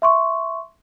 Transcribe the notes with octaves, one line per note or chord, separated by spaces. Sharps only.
E5 C6 C#6